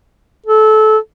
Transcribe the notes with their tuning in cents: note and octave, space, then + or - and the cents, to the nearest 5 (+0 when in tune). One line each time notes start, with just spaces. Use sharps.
A4 -20